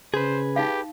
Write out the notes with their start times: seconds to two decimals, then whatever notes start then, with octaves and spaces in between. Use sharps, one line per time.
0.14 C#3 G#4 B4 C5
0.56 D#4 G4 F5